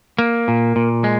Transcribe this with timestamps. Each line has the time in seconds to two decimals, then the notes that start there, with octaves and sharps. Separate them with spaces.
0.18 A#3
0.48 A#2
0.76 A#2
1.04 G#3